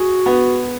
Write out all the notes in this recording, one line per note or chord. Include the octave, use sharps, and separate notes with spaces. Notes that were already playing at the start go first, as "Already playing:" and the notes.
Already playing: F#4 G#4
B3